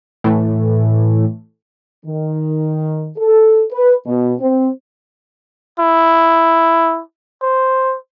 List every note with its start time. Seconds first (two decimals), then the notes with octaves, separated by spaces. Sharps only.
0.24 A2 E3 A3
2.05 D#3
3.17 A4
3.72 B4
4.06 B2
4.39 C4
5.80 E4
7.42 C5